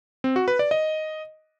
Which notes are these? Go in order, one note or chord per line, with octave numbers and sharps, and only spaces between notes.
C4
F#4
B4
D5
D#5